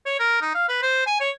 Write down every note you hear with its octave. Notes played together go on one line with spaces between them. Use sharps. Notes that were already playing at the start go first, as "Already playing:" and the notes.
C#5
A#4
D#4
F5
B4
C5
G#5
C#5